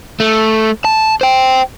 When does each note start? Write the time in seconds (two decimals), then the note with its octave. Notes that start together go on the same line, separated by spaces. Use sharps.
0.20 A3
0.85 A5
1.21 C5 G5